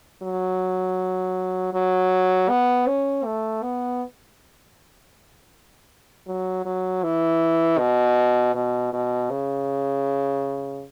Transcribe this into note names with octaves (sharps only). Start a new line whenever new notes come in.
F#3
F#3
B3
C#4
A3
B3
F#3
F#3
E3
B2
B2
B2
C#3